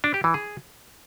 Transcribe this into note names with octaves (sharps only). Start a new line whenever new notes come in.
D4
G4
E3
G#4